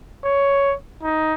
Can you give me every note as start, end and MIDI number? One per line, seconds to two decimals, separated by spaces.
0.25 0.74 73
1.03 1.35 63